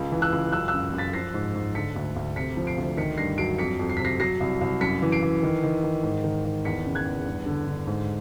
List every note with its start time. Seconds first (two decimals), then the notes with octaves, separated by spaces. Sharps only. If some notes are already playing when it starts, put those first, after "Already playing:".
Already playing: C#2
0.12 E3
0.22 E6 F#6
0.32 C#2
0.52 F#2 E6 F#6
0.68 E6 F#6
0.73 F#2
0.93 F#2
0.98 A6 B6
1.13 F3 A#6 C7
1.34 G#2
1.55 G#2
1.75 D3 B6 C#7
1.96 D2
2.16 D2
2.36 C3 B6 C#7
2.57 F3
2.67 C7 D7
2.78 D2
2.97 D#3 B6 C#7
3.18 G2 A#6 C7
3.38 F#3 C7 D7
3.59 F2 B6 C#7
3.79 F2
3.90 C7
3.97 B6
4.00 C3 A#6 C7
4.20 F#3 A#6 C7
4.40 C2
4.61 C2
4.81 F#2 B6 C#7
5.02 E3
5.12 C7 D7
5.22 E3
5.43 D#3
5.63 D#3
5.83 D#3
6.03 G#2
6.24 D#3
6.45 D#3
6.65 E2 B6 C#7
6.86 C#3
6.95 F#6 G#6
7.05 E2
7.26 G2
7.46 D3
7.67 D3
7.87 G#2